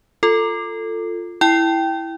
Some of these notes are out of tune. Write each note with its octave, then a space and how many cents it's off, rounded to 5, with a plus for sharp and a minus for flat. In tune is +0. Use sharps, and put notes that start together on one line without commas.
F4 +0 A4 +15
E4 +0 G5 +0